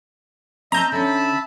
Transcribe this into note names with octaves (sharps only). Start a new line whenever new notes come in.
C4 D#5 E5 A5 A#5 G6
D3 C#4 E5 A5 B5